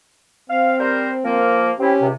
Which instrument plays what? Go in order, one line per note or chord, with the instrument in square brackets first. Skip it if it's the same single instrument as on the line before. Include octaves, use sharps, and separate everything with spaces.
[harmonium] C4 [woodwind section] F5
[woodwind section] G3 A#4 C5
F3 A#3 A#4
[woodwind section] C4 E4 [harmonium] C#4 G4
[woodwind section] C#2 C3